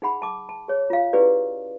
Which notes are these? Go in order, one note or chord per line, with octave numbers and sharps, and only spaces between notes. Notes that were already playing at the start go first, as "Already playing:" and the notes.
D#4 G#4 F#5 B5
A5 D6
A5
G#4 C#5
F4 F5
C#4 E4 G4 G#4 B4 D5